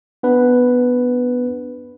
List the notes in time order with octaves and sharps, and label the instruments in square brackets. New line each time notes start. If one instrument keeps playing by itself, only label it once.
[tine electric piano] B3 D4 B4